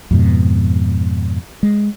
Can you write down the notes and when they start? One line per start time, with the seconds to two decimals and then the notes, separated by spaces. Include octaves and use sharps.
0.11 F2 G#2 B2
1.63 G#3